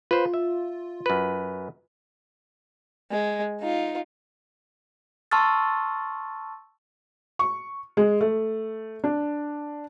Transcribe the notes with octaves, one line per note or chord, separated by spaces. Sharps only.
F4 B4 C5
E5
F#2 B4
G#3
D#4 F4
A5 C6 C#6 E6 F6 A6
C#6
G#3
A3
D4